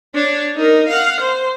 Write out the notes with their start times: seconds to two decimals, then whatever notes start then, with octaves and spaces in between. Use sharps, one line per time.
0.14 D4 C#5
0.56 D#4 A#4
0.88 F5 F#5
1.21 C5